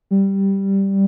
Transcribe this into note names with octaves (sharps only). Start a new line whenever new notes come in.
G3